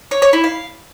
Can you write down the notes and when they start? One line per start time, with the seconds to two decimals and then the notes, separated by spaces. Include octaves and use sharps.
0.11 C#5
0.22 C#5
0.33 E4
0.44 F5